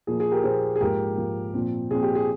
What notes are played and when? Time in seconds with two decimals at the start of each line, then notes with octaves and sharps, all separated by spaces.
0.07 A#2 F3 A#3 G#4
0.20 G#4
0.31 G4 A#4
0.44 A#2 F3 A#3 G#4 C5
0.76 G#4
0.80 G#2 F3 A#3 G4 A#4
1.17 G#2 F3 A#3
1.54 A#2 F3 C4
1.91 A#2 F3 C4 G#4
2.03 G4
2.15 G#4